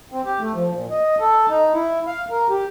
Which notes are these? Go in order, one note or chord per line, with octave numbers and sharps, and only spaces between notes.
C4
G4
A3
F3
A#2
D#5
A4
D#4
E4
F5
A#4
G4